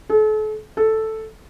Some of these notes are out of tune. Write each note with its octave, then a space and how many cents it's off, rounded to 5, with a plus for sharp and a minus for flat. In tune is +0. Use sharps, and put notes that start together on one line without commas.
A4 -40
A4 +0